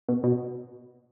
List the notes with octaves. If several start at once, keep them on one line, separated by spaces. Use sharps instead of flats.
B2
B2